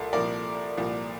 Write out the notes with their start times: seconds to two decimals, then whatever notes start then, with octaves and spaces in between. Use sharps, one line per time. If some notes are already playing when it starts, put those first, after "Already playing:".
Already playing: C2 A#2 A4
0.13 C2 A#2 F3 A#4 D5
0.77 C2 A#2 F3